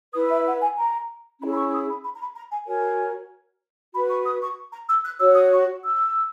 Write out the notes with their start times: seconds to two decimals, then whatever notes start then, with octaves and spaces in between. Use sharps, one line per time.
0.14 E4 B4 D#6
0.30 E5
0.46 F#5
0.61 G#5
0.77 A#5
1.40 C#4 E4 G#4 B5
1.52 B5
1.56 C#6
1.72 D#6
1.88 B5
2.04 B5
2.15 A#5
2.20 B5
2.35 A#5
2.51 G#5
2.67 F#4 A#4 C#5 G#5
3.93 F#4 B5
3.96 B4
4.09 C#6
4.25 D#6
4.41 C#6
4.72 A#5
4.88 E6
5.04 F#6
5.20 F#4 C#5 E6
5.35 D#6
5.51 C#6
5.83 E6